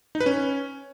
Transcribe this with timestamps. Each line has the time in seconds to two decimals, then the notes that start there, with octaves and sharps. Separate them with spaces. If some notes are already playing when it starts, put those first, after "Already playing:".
0.15 D#4
0.20 B4
0.26 C#4